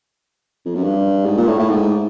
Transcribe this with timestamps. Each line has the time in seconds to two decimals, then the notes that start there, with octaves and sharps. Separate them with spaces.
0.65 F2
0.75 F#2
0.84 G2
1.26 G#2
1.37 A#2
1.48 A2
1.59 A2
1.69 G#2